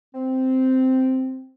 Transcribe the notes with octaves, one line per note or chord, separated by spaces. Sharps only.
C4